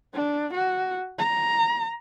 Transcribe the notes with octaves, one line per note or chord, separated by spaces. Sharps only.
D4
F#4
A#5